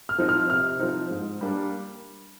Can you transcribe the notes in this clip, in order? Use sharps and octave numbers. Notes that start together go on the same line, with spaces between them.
F6
F3 C4 D#4
F6
C3 F6
F3 C4 D#4
G#2
G3 A#3 D4